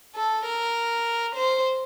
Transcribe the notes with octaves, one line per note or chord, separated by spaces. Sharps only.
A4
A#4
C5